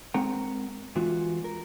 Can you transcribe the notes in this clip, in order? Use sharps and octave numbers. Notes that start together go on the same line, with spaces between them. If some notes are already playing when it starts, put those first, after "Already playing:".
G#3 C4 A#4 F#5 A#5
E2 E3 G#3 F4 F#4
A#4